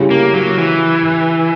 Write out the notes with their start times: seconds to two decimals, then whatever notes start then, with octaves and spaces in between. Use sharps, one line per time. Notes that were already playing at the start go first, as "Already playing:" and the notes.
Already playing: C#3 G3 C#4 E4
0.10 A#3
0.34 F#3
0.58 E3